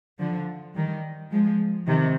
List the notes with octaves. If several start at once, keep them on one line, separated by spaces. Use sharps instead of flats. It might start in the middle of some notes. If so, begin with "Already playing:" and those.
D3 F3
D#3 G3
F3 G#3
C3 D#3